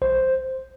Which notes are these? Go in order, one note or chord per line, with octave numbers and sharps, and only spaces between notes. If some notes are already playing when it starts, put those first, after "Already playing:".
B1 C5